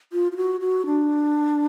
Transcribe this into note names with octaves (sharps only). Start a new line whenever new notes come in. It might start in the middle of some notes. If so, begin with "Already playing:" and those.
F4
F4
F#4
F#4
D4